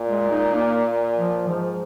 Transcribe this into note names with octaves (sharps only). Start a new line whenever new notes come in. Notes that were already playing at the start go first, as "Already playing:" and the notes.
Already playing: A#2
G#3
D#4
A#3
F3
G#2 F3